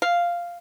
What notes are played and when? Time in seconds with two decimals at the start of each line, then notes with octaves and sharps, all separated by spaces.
0.02 F5